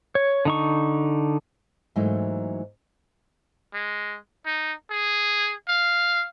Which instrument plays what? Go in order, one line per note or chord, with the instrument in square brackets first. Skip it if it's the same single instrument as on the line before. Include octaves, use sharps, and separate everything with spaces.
[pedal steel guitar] C#5
D3 D#4 C#6
[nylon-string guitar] G#2 E3 F#3 A3 A#3 D#4
[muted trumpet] G#3
D#4
G#4
F5